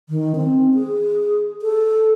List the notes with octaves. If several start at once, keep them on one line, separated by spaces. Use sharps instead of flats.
D#3
C4
G#4
A4